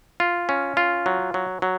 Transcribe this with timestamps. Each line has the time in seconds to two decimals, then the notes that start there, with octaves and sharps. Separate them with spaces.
0.20 F4
0.49 C#4
0.77 F4
1.06 F#3
1.34 F#3
1.62 F#3